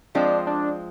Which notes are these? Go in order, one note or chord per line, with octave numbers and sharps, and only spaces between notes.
F3 G#3 C4 D4 F4
D4